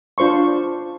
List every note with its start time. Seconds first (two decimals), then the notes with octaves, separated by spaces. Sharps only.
0.18 D4 F4 C5 C6 C#6